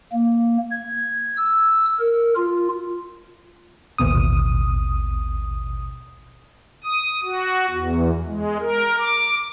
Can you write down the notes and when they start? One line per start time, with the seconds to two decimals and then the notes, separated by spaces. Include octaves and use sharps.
0.13 A#3
0.70 G#6
1.37 E6
1.99 A#4
2.37 F4
3.98 A1 D#2 B2 D#6
6.84 D#6
7.23 F#4
7.70 E2
8.26 G#3
8.60 A#4
8.98 D6